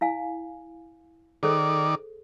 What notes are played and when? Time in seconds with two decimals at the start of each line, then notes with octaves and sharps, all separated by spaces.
0.01 E4 F5 G#5
1.43 D#3 G#4 A4 C5 D5